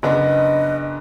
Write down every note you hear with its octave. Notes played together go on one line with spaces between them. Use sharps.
F#1 B3 D4 D#5